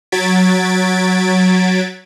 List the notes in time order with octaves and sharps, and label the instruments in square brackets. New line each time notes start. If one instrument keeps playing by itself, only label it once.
[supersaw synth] F#3 G#6 A6 B6 D7